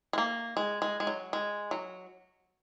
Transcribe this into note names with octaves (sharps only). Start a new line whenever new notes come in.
G#3
A#3
G#3
G#3
G#3
F#3
G#3
F#3